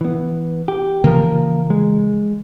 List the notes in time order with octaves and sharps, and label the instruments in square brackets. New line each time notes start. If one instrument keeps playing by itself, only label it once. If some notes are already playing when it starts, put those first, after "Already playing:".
[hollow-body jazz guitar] E3 B3
G4
[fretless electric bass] C#3 E3 F3 [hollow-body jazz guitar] A#3 A#4
[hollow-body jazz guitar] G#3